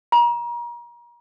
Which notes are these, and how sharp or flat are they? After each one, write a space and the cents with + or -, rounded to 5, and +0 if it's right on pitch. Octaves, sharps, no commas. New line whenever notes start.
A#5 +35